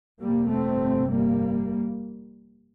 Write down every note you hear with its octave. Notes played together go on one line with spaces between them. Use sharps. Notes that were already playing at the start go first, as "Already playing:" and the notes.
G1 F2 C3 G3 A#3
A3 C4
G3 A#3